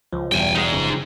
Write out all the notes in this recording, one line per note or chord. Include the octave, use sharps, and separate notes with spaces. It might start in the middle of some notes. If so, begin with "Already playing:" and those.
C#2 F3
E1 E2 G3 G5 G#5
D#4 G#4
F#1 C#3 F3